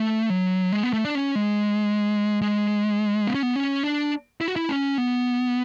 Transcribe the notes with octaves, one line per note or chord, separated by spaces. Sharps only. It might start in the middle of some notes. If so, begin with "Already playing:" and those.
Already playing: A3
F#3
G#3
B3
A3
D4
C#4
G#3
G#3
B3
C#4
B3
C#4
D4
E4
F#4
E4
C#4
B3